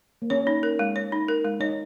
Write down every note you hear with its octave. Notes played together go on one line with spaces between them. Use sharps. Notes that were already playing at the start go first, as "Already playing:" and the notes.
A#3
C#4 C#5
D#4
A#4
G#3
C#5
D#4
A#4
G#3
D#4 C#5